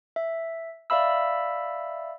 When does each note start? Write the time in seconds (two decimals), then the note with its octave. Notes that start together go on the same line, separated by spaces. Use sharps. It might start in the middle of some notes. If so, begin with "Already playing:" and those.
0.16 E5
0.90 D5 E5 F5 B5 E6